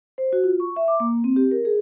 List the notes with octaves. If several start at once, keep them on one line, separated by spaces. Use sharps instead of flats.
C5
F#4
F4
C#6
E5
D6
A#3
C4
G4
A#4
G#4